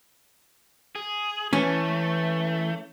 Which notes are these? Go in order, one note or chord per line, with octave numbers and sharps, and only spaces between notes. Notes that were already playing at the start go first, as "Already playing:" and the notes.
G#4
E3 A3 C#4